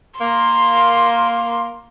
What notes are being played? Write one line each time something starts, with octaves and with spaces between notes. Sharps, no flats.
A#3 C6